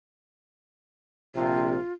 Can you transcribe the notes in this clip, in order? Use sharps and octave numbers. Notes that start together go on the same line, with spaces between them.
A#1 C3 F4